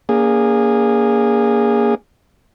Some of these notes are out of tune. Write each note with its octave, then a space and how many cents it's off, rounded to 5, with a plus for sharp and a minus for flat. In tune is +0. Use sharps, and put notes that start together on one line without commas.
A#3 +5 C#4 +40 G#4 -15